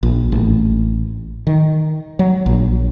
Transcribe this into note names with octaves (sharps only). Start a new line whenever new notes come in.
A#1
A1
D#3
F#3
A#1